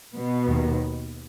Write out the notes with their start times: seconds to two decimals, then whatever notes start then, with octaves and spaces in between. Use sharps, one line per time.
0.15 B2 B3
0.47 D#2 D#3